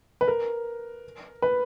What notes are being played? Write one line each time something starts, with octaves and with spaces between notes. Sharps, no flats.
B4
A#4
B4